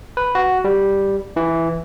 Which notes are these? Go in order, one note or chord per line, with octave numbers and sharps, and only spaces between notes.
B4
F#4
G3
E3